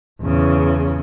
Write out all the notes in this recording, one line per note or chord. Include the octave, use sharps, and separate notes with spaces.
E2 C#3